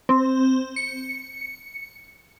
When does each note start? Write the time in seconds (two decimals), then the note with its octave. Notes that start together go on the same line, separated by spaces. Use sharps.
0.09 C4
0.76 C#7